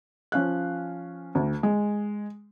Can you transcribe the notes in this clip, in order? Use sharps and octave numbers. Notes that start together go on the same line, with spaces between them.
F3 C#4 F5 F#6
D2
G#3